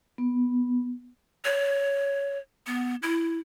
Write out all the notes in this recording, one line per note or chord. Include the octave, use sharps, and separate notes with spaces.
B3
C#5
B3
E4